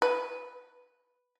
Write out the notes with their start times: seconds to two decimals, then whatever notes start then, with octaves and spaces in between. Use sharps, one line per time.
0.02 B4